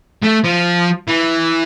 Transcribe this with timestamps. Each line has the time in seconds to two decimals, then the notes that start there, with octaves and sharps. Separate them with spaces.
0.23 A3
0.44 F3
1.08 E3